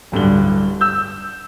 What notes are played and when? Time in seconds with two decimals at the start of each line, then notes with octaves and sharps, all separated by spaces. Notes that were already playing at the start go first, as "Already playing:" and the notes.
0.12 D1 G2 D3 G7
0.81 E6 G6